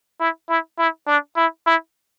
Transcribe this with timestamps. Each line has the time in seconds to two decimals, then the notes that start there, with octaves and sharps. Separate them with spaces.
0.20 E4
0.49 E4
0.79 E4
1.07 D4
1.37 E4
1.66 E4